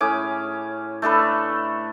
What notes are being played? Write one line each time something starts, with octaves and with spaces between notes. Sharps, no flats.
A2 C#4 G#4 D6
A3 D4 A4 B4